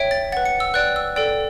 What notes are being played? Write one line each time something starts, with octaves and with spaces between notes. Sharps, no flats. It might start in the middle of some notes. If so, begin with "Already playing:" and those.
Already playing: C#5 E5 G5
A6
B4 F#5 A6
C#7
E6
B4 D5 G5 F#6
E6
A4 D5 G5